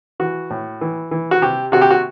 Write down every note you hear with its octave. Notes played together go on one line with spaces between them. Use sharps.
E3 F#4
A2
E3
E3
F#4
C3 G4
C3 F#4
G4
F#4